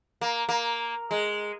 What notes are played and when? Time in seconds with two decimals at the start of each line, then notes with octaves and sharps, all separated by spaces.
0.21 A#3
0.49 A#3
1.11 G#3